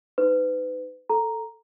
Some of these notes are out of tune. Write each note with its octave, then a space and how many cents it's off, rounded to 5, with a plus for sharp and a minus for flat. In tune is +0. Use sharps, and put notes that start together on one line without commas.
D#4 +0 B4 +35
A4 +5 A#5 +0